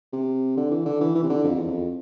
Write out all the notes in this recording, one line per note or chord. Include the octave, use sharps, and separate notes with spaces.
C3
D3
E3
D3
E3
E3
C3
D3
F2
E2
F2